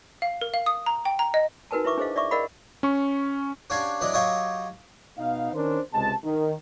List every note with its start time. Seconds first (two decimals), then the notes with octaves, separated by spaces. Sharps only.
0.22 F5
0.41 A#4
0.54 F5
0.66 D#6
0.86 A#5
1.05 G5
1.19 A#5
1.34 D#5
1.71 D#4 F#4 A#4 B4 G#5 A5
1.84 E4 B4 E5 C#6 D6
1.97 D4 G#4 C5 D#5 F5
2.16 D5 E5 C#6 D6
2.31 A#4 D5 D#5 F5 F#5 B5
2.83 C#4 C#6
3.70 C#4 D4 F#4 G4 F5 G#5
4.01 E3 F#3 D4 D5 D#5
4.14 F#3 F4 G4 C#5 D#5
5.18 B2 B3 D#4 F5
5.53 D#3 C#4 D4 A#4 C5
5.94 C#2 C3 G#3 A5
6.24 D#3